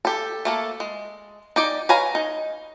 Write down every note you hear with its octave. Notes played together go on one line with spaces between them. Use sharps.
G4 A4
A3 A#3 A4
G#3
D#4 G4 D5
B4 C#5 F5 G#5 A#5
D#4